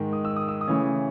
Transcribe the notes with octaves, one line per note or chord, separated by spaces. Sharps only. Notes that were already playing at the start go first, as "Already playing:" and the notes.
Already playing: G#2 D#3 G#3
D#6
E6
D#6
E6
D#6
C#3 E3 A3 C#4